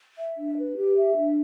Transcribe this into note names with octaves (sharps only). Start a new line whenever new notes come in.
E5
D4
B4
G4
E5
D4